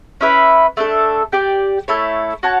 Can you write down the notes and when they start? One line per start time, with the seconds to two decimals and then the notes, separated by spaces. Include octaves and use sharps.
0.21 C#4 E4 B4 E5
0.77 A3 D4 A4
1.32 G4 D5 G5
1.88 A3 E4 A4 C#5
2.43 F#4 C#5 F#5 A5